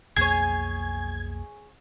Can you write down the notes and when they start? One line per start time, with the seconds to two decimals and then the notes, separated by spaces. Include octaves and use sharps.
0.17 B1 F2 A#3 G#4 C#5 G#6